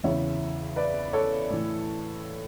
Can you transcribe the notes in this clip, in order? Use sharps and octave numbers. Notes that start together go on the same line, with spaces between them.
E2 C#3 E3 C#5 E5
B4 D5
A4 C#5
A2 E3